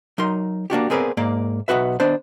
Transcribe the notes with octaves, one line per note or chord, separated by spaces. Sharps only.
F#3 D#4 A#4 C6
A#3 D4 F#4 G4
B3 C4 G#4 A#4 B4 D5
G#2 A#3 D5
B1 B3 F#4 B4 E5
D#3 B3 D4 C5